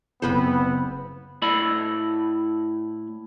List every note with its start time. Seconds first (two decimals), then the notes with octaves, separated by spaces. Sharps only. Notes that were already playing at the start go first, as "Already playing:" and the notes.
0.22 F#1 B3 C4 B4 C5
1.42 A2 E4 D5 B5